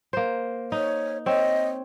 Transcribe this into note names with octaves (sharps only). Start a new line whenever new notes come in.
A#3 C5
D#4 C#5
C4 C#5 D#5